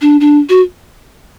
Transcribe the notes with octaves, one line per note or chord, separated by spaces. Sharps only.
D4
D4
F#4